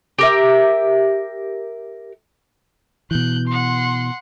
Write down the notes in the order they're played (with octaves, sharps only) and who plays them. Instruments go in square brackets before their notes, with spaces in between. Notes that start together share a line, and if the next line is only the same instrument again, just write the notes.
[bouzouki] G4 A#4 E5
[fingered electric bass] B2 E3 [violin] F#6 G6
[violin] F#5 C6